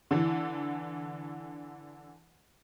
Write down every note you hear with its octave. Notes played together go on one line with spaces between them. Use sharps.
D3 E3